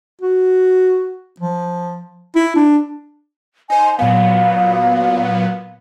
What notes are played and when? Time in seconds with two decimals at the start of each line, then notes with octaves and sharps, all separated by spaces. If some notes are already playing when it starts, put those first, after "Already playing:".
0.21 F#4
1.40 F3
2.35 E4
2.56 D4
3.70 D#4 C5 G#5
3.99 A#2 F#3 B3 F5